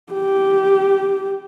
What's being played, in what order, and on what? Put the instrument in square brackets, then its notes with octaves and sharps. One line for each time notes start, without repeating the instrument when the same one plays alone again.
[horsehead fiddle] G4